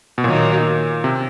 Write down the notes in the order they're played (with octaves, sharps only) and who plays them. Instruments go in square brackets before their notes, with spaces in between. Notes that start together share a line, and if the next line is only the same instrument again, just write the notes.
[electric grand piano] B2
[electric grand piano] A#2 [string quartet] D#3 F#3 A#3 D#4
[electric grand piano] C3